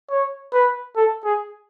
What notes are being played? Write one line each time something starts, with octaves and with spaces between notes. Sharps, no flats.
C#5
B4
A4
G#4